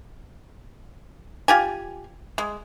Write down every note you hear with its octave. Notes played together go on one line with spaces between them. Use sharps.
F4 G4 G#5
G#3